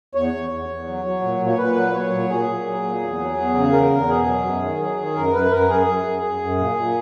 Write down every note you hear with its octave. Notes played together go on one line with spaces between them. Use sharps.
E2 C#5
E2
E2
E2
F#3
F#3
A#2
A#2
C#5
A#2 B4
F#3
F#3 C#5
A#2
A#2 G#4
A#2
F#3
A#2
E2
F#3
E2
C#3
E2 A#4
E2
B2 G#4
F#3
F#2
D#3
F#3
D#3
F#2 A#4
F#2 B4
F#2 A#4
F#2 G#4
F#2
F#2
F#2
F#2
A#2
A#2